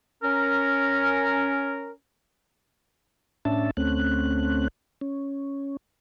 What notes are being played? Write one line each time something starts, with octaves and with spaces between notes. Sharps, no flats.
C#4 A#4
A2 C#4 D4 E5 A5
D2 A3 C4 C#4 F#6
C#4